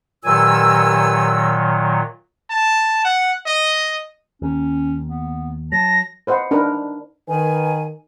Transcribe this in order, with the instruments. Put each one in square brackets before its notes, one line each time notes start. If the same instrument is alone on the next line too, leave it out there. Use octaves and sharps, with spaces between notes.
[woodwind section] G2 G#5 E6 [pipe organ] A#2 D#3 F#3
[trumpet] A5
F#5
D#5
[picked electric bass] D#2 [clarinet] C#4
[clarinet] B3
[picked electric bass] F#3 [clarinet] A5 [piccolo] A#6
[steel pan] B4 C5 D#5 F#5
D4 D#4 A#4 B4
[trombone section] D#3 [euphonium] B4 [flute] G#5